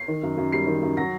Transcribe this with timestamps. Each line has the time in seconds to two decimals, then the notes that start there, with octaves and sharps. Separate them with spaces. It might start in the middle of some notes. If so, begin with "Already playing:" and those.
Already playing: C7
0.08 D#3
0.23 F#2
0.37 F#2
0.52 G3 C7
0.67 D#3
0.82 F#2
0.97 F#3 A#6